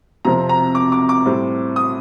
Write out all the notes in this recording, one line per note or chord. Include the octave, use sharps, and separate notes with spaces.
F2 C3 F3 C4 A#5
A#5
D6
D6
D6
A2 G3 C4
D#6